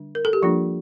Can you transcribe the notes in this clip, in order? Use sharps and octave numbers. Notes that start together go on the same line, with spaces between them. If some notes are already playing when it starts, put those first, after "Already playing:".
Already playing: D3 G3 D4
A#4
A4
G4
F3 G3 A#3 D4 F4